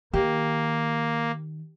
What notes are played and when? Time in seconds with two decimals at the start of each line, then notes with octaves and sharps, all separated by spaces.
0.13 D#3 A#3 G4